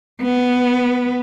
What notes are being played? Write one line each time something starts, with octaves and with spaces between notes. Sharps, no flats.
B3